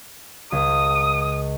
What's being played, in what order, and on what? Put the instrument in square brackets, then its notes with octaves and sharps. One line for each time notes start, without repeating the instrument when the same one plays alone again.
[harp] C#2 [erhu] D#6